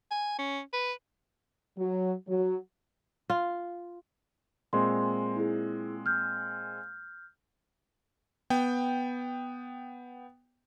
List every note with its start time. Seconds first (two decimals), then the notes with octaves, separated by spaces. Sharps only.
0.11 G#5
0.39 C#4
0.73 B4
1.78 F#3
2.28 F#3
3.30 F4
4.73 A#2 G#3 C4 C6
5.36 E4 G#4
6.06 F6 G6
8.50 B3 G5